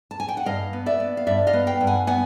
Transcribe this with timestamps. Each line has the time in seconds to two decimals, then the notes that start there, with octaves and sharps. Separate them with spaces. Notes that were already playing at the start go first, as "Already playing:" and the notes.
0.11 A5
0.20 G#5
0.28 G5
0.37 F#5
0.46 G2 D#5 F5
0.73 B3
0.86 D5 E5
1.00 B3
1.17 F5
1.27 G2 D5 E5
1.47 D#5 F5
1.53 B3
1.67 F5 G5
1.81 G2
1.87 F#5 G#5
2.07 B3 F#5 G#5